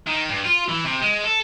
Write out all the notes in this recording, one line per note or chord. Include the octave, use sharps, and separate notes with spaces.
D#3
G2
F4
E3
C3
G#3
A4